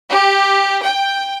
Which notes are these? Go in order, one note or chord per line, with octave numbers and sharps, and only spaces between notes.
G4
G5